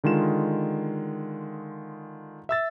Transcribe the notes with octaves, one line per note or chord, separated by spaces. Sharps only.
D3 D#3 G#3 F4 E7
E5 E6 A6